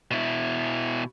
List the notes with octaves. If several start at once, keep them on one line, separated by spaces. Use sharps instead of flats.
B2 E4